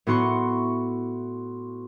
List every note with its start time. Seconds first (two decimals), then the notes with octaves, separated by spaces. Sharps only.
0.07 A2 B3 E4 F#4 C6 C#6